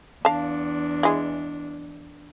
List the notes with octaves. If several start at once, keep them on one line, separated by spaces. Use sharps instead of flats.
E2 D4 F5 A5
E3 G#3